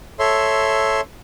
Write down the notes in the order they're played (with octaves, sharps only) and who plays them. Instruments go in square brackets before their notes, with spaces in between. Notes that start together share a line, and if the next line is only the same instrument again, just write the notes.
[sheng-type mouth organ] A4 C#5 E5 C6